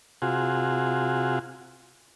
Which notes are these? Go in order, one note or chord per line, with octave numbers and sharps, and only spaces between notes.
C3 F4 F#4 G#4